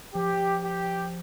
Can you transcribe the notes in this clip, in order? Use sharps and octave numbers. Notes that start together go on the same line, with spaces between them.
F3 G4
G4